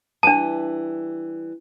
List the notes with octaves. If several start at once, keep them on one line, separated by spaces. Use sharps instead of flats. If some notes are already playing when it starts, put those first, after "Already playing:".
E3 G3 D4 A5